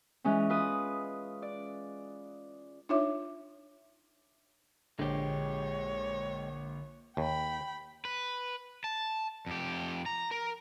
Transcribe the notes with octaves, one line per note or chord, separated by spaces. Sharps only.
E3 G#3 C#4
F4 B4 D#6
D5
D4 D#4 F4 C#5 E5 D6
A#1 D3 G#3 G4 C#5
D#2 G5 B5
B4
A5
F2 G4
A#5
A#4